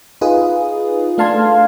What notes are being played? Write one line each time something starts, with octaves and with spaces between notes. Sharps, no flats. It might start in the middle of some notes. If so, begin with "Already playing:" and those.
D#4 F4 G#4 B4 D#6
A3 D4 F5 A5 C6 G#6